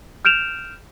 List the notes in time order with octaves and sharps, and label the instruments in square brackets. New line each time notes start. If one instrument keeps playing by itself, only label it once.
[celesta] F6 G6 D7 E7 F7